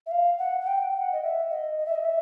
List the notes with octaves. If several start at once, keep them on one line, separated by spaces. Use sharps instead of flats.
E5
F5
F#5
F#5
G5
F#5
D#5
E5
D#5
D#5
E5
D#5
E5